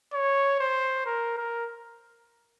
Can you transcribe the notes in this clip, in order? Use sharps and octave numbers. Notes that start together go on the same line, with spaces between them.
C#5
C5
A#4
A#4